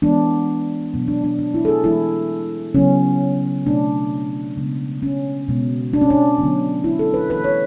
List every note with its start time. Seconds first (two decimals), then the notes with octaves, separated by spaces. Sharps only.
0.02 E3 G#3 B3 D4
0.94 B2 F#3 B3
1.08 D4
1.24 D4
1.39 D4
1.54 E4
1.65 A4
1.68 G#4
1.83 E3 G#3 B3 E4
2.74 C#3 F#3 B3 C#4
3.66 B2 A3 D4
4.57 C#3 G#3 B3
5.02 C#4
5.48 B2 G#3 B3
5.93 D4
6.01 C#4
6.10 D4
6.38 D3 F#3 B3
6.84 E4
6.99 A4
7.14 B4
7.29 E3 A3 B4
7.44 C#5